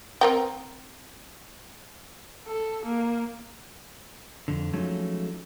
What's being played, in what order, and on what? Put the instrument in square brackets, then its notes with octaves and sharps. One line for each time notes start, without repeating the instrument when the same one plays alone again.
[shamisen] C4 A#4 G5
[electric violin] A4
A#3
[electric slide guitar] F2 D3
F3 F#3 G#3 A3 C#4 D#4